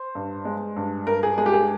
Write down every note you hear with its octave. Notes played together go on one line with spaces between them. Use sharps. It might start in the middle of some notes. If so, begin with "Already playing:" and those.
Already playing: C5
G2
G#3
G2
G2 A#4
G#4
G#3 G#4
G4
G#4